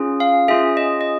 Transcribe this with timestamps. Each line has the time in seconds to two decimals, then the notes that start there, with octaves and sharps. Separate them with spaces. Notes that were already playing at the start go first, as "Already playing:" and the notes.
Already playing: C#4 F4 G#4
0.20 F5
0.48 C#4 F4 G#4 E5
0.77 D#5
1.01 D#5